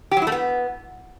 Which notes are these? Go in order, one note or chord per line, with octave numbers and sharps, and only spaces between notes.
G4
F#3
E4
A3
B3